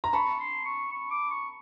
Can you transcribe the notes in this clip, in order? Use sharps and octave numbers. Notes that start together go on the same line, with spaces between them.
A#5
A5 B5 C#6
C6
C#6
C#6
D6
C#6